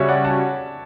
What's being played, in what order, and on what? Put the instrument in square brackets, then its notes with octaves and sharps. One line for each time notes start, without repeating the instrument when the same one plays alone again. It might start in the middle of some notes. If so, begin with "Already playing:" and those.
Already playing: [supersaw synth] C#3 G3 C#4 F#4 [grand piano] C#5 E5
[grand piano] D5 F#5
F#5 A5